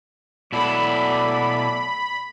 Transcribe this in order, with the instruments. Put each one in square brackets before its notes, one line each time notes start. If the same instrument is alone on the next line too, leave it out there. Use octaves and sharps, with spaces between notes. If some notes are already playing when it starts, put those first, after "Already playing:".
[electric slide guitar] B2 E4 [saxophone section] F#3 A3 D5 [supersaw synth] B5